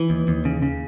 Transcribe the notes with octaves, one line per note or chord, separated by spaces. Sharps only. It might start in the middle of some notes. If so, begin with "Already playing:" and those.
Already playing: E3
D#2
D#2
C#3
C#3